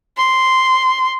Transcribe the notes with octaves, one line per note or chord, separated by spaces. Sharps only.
C6